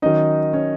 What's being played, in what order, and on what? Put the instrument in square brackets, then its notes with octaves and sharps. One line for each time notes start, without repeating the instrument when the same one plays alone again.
[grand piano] D#3 F#3 C#4 D#4 D#5
C#4 C#5